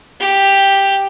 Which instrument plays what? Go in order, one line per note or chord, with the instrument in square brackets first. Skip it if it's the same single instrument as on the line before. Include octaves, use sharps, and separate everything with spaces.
[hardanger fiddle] G4